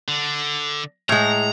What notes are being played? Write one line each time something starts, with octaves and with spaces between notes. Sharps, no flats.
D3
A2 G#3 A#5